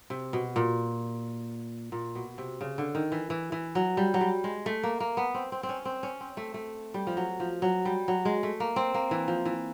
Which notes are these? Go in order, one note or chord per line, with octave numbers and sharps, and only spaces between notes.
C3
B2
A#2
A#2
B2
C3
C#3
D3
D#3
E3
E3
E3
F#3
G3
F#3
G3
G#3
A3
A#3
A#3
B3
C4
C4
C4
C#4
C4
C#4
C4
A3
A3
G3
F3
F#3
F3
F#3
G3
F#3
G#3
A3
A#3
C4
A#3
E3
F3
E3